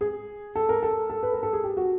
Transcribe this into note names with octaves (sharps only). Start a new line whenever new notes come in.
G#4
A4
A#4
A4
A4
B4
A#4
A4
G#4
G4
F#4